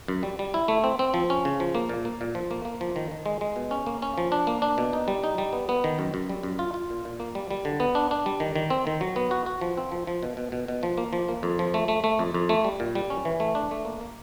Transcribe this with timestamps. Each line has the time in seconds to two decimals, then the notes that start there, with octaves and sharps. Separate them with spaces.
0.08 F#2
0.23 G3
0.39 G3
0.54 E4
0.68 A3
0.84 C4
0.99 C4
1.14 F3
1.30 C#4
1.45 C#3
1.60 F3
1.75 A#3
1.89 A#2
2.05 A#3
2.21 A#2
2.35 F3
2.51 A#3
2.65 A#3
2.81 F3
2.96 D#3
3.11 D#3
3.26 G#3
3.41 G#3
3.56 B2
3.71 C#4
3.86 A#3
4.02 C#4
4.18 F3
4.32 D4
4.47 A#3
4.62 D4
4.78 B2
4.93 D#4
5.08 G3
5.24 D#4
5.38 G3
5.53 B3
5.69 B3
5.84 D#3
5.99 F#2
6.14 F#2
6.29 G3
6.43 F#2
6.59 F4
6.74 F4
6.90 A#2
7.05 A#2
7.20 A#3
7.35 G3
7.51 G3
7.65 D3
7.80 B3
7.95 D4
8.11 D4
8.26 G3
8.40 D#3
8.56 D#3
8.70 C4
8.87 D#3
9.01 F#3
9.16 B3
9.31 F#4
9.46 F#4
9.61 F3
9.77 C4
9.92 F3
10.07 F3
10.23 B2
10.37 B2
10.52 B2
10.68 B2
10.83 F3
10.97 A#3
11.13 F3
11.29 A#3
11.43 F2
11.59 F3
11.74 A3
11.88 A3
12.04 A3
12.19 F2
12.34 F2
12.49 A3
12.65 G3
12.80 A#2
12.95 G3
13.10 C#4
13.25 E3
13.40 A3
13.55 D4
13.71 A3
13.85 A#3
14.01 A#3